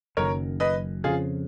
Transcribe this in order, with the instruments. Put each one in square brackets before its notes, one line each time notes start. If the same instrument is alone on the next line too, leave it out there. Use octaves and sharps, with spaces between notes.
[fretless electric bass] F#1 F#2 D#3 [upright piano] A#4 C#5
[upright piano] B4 D#5
[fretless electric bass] F2 C#3 F3 [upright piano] F4 G#4